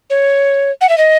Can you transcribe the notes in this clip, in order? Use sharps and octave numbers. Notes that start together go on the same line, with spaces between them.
C#5
F#5
E5
D#5